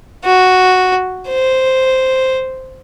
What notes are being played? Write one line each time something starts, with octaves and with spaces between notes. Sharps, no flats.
F#4
C5